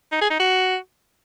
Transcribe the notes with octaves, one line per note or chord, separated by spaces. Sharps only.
D#4
G#4
D#4
F#4